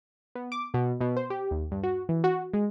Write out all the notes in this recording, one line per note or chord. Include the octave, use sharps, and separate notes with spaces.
B3
D6
B2
B2
C5
G4
D#2
G2
F#4
E3
F#4
G#3